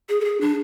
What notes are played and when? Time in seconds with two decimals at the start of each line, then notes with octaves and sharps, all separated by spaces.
0.09 G#4
0.21 A4
0.25 G#4
0.41 D4